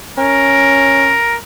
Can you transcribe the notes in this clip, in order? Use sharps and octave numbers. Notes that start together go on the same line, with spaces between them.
C#4 A#4